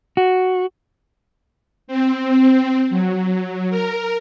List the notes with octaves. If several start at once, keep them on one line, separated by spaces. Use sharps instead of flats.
F#4
C4
F#3
A#4